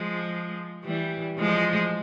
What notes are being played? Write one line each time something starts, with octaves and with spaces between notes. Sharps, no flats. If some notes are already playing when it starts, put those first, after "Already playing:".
Already playing: F3 G#3
E3 G3
F3 G#3